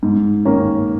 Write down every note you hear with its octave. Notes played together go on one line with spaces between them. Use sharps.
G#2
D#3 A#3 C#4